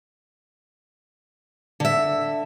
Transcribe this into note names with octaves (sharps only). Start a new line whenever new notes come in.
D3 E5